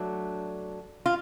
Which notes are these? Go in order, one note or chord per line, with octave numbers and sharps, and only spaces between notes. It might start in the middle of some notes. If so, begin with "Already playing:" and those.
Already playing: F#3 A3 D4
F4